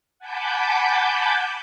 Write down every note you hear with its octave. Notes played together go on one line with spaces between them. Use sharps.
F#5 G#5 A5 B5 D6 G6